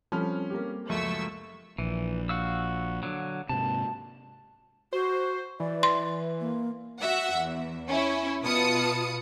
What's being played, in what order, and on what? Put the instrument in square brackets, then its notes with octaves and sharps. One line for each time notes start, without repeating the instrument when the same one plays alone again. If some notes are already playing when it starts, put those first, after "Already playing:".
[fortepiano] F3 [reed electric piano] G3 C4 A4 [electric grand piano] C#4 B5 F6
[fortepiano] A#3 G4
[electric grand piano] C#2 F#2 [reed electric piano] F3 G#3 [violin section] A3 C#6 E6
[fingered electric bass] A#1 [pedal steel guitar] E3
[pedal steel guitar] F#4 F5 E6
D3 F#3
[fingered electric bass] G#2 C3 [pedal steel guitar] A5
[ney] F#4 [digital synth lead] C5
[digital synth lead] E3 [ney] D5
[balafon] C6
[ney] A#3
[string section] F#4 E5 F#5
E2
C#4 E4
B2 F4 B4 A5 D#6 C#7